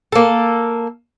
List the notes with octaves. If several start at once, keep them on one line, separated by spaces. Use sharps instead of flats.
A#3 A4